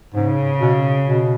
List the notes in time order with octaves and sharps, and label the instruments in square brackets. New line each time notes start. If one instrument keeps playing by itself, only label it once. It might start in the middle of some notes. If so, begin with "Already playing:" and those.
[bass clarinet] G#2 [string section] C#3
[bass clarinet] B2
B2